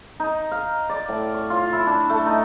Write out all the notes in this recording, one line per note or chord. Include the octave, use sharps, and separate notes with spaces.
D#4
F5
D5
A2
C#5
F4
E4
D4
A3
D#4